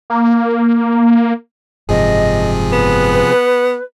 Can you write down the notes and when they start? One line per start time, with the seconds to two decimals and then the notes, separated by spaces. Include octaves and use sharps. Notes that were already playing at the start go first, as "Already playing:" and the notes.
0.10 A#3
1.89 F#1 G#2 C3 F3 G#4 D#5
2.72 B3 B4